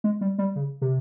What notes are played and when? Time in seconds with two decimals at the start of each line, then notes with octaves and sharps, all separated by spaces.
0.04 G#3
0.21 G3
0.38 G3
0.56 C#3
0.82 C3